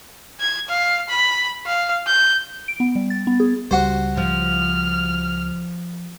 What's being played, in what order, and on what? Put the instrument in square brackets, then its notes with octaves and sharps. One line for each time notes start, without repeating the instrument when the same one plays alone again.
[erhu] G#6
F5
B5
F5
G6
[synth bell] D7
B3
G3
A6
B3
G#4
[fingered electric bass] C#2 G3 [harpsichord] F#4 C5
[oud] F3 [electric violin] F6